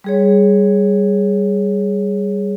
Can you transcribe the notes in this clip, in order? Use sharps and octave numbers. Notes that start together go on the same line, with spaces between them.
G3 G#4 C#5